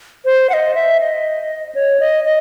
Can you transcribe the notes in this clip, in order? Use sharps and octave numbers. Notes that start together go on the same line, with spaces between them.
C5
F#5
D#5
E5
D#5
C#5
D#5
D#5